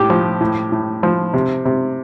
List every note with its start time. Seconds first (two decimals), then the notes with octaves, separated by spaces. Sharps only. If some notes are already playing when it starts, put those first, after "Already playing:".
Already playing: A2 G4
0.10 F3
0.41 A2
0.72 A2
1.03 F3
1.34 C3
1.65 C3